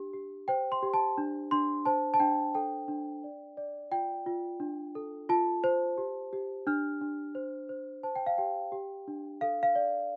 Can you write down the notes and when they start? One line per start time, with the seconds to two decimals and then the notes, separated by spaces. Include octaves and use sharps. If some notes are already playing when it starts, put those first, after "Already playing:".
Already playing: D4 G4
0.13 G4
0.48 C5 G5
0.72 C6
0.83 G4
0.94 A5
1.18 D4
1.51 D4 C6
1.85 C5 A5
2.14 A5
2.19 D4 G5
2.55 A4 G5
2.88 D4
3.24 D5
3.57 D5
3.91 F4 G5
4.26 F4
4.60 D4
4.95 A4
5.29 F4 A5
5.64 C5
5.98 G4
6.33 G4
6.67 D4 F6
7.01 D4
7.35 C5
7.69 C5
8.03 C5 A5
8.16 G5
8.27 F5
8.38 G4 G5
8.72 G4
9.08 D4
9.41 A4 F5
9.63 F5
9.75 D5